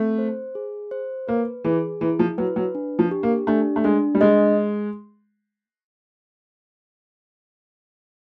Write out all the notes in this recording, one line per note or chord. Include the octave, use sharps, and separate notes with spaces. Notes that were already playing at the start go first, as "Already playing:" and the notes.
Already playing: A3 C4
C5
G#4
C5
A#3 B4
E3 G#4
E3 E4
F3
F#3 B4
F#3
D4
F3
G4
A#3
A3 D4
A3
G#3 D4
G3
G#3 D#5